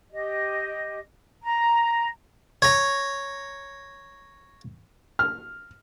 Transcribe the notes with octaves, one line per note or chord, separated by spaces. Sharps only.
G4 D#5
A#5
C#5 A#5
F6